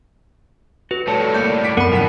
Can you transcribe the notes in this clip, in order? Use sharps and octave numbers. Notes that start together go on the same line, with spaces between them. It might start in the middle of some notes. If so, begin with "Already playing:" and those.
F#4 B4
A2 G3 A4 C#5 A5
A#3 D5 G6 C#7
D6 B6 D7
F#2 B3 A#4 F#5 B5
F2 G#2 B2 D3 G5 B6